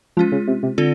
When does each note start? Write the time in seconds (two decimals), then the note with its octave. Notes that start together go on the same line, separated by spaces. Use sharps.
0.17 F3 G#3 C#4 F4
0.32 C#3
0.47 C3
0.63 C3
0.78 D3 C4 F4 A4